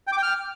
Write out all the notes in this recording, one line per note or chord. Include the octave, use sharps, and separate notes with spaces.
G5
D6
G5
F6